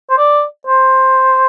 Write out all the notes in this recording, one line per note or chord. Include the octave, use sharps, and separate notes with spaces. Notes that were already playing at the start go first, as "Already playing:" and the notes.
C5
D5
C5